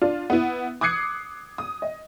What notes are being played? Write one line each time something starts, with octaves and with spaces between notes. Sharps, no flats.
D4 F4
B3 E4
D6 D#6 F#6 G#6 C7 C#7
D#6
D#5